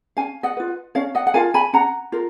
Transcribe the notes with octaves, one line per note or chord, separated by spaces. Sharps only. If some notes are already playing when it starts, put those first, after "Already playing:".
C#4 F5 G#5
D#5 F#5
F4 B4
C#4 C#5 F5
D#5 F#5
F#5
F4 A#4 F5 G#5
G#5 B5
C#4 F#5 A#5
F4 A#4